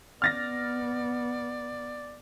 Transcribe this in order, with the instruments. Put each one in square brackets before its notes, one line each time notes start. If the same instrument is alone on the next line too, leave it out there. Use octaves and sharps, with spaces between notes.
[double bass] B3 [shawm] D5 [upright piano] F6 A6 A#6